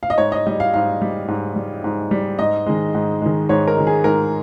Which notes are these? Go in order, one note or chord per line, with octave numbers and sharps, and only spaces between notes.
F5
D#5
G#2 C#5
D#5
G3 D#5
F5
G#2 F5
G3
G#2
G3
G#2
G3
G#2 D#5
D#3 G#3
G#2
D#3 G#3
G#2 C#5
A#4
D#3 G#3
G#4
G#2 A#4